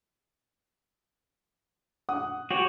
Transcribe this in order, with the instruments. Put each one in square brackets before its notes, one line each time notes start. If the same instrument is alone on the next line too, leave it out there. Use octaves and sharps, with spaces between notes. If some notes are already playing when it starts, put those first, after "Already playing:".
[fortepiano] F#5 D#6
[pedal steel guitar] F#4 G4 C#5